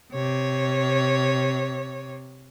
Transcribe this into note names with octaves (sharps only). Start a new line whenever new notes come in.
C3 C#5